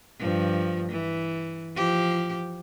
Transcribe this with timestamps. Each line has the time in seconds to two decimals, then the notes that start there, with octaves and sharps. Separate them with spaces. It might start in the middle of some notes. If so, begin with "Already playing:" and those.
0.19 G2 F3
0.90 E3
1.75 F3 G4